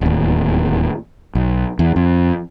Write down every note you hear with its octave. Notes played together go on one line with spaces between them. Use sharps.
D1 D#2
B1
E2
F2